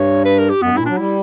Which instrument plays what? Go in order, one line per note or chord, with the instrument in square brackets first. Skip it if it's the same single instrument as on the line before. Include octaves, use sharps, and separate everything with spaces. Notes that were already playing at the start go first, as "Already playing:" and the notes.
Already playing: [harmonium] G2 [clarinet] C#5
[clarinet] B4
A#4
G4
[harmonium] F#2 [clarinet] B3
[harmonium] G2
[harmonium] A#2 [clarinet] E4
[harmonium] F#3 [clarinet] D4
[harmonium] G3 [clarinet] E4